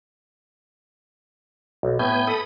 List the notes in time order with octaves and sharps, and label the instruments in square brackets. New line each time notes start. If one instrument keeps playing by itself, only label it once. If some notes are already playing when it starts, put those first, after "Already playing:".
[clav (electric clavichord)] B1
[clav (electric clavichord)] A2 [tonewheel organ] B3 G#5 G6
[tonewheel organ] A4 B5 D#6